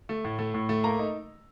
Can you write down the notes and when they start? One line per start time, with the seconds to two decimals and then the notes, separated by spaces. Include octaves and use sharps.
0.09 A3
0.25 A2
0.39 A3
0.54 A2
0.69 A3
0.84 A#3 A#5
0.99 D#4